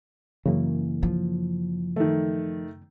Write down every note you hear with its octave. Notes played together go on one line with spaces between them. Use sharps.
F#2 C#3 E3 A#3
F3
D#3 A3